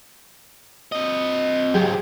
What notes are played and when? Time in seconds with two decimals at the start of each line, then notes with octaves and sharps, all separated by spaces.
0.92 C4 D#5
1.74 C#2 G#2 F#3 G4 G#4